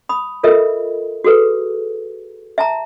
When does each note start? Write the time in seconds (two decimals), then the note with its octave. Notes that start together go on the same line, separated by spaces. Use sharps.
0.09 B5 D#6
0.43 F4 A4 A#4 D#5 E5
1.24 F#4 G#4 A4 B4
2.58 E5 A5 A#5